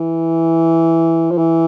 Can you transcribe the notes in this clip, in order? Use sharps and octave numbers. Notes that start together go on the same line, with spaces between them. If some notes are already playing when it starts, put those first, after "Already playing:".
Already playing: E3
F3
E3